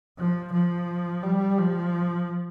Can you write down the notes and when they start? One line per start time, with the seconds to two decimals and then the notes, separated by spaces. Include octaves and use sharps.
0.19 F3
0.53 F3
1.23 G3
1.58 F3